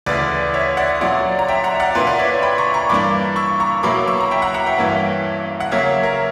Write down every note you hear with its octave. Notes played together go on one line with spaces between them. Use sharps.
D2 C#3 E3 B4 D5
C#5 E5
D5 F#5
A#2 F#3 C#4 D5 F#5
A#5
E5 G5
F#5 A#5
D5 F#5
A#2 A#3 D4 B4
B4 D5
C#5 E5
G5 B5
A#5 C#6
A#5 C#6
G2 E3 A#3 D4 B5 D6
C#6 E6
A#5 C#6
B2 F#3 A#3 E4 B5 D6
C#6 E6
A#5
E5 G5
F#5 A#5
F#5 A#5
E5 G5
G2 E3 A#3 C#4
F#5
C#3 F#3 A#3 C#5 E5
A#4